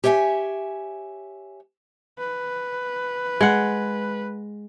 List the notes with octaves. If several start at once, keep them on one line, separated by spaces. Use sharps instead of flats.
G4 C#5 E5 F5 G#5
B4
G#3 F#5